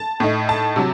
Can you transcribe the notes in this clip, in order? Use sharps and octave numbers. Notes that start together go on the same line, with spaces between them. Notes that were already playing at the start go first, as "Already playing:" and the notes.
Already playing: A5
A2 A3 D#4
A5
C3 F#3